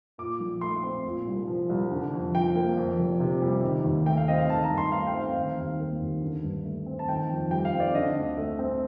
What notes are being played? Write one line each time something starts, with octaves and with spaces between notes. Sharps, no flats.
A#2 D6
A#1
A3 C6
C4
A#2
C2
F3
C2
D3
F2
F3 G5
A#3
F2
F1
C3
G3
D#3
D#2
A3 G5
F5
C4 D#5
F5
D#3 A5
A#5
G2
C6
A3 F5
G5
C4
F5
D#3 F5
D#2
A#3
D#2
D3
G2
A3
C4
A5
D#3 G5
F2
G3 G5
F5
C4
D5
D3 D#5
D2
A3
C4